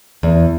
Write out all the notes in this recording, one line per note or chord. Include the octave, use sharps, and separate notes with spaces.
E2